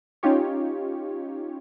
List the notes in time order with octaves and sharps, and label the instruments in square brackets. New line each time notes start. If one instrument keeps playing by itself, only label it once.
[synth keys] C#4 D#4 F4 G4 C#5